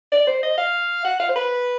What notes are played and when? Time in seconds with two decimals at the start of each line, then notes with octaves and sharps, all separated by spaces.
0.12 D5
0.27 C5
0.43 D#5
0.58 F5
1.05 F#5
1.20 F5
1.29 C5
1.36 B4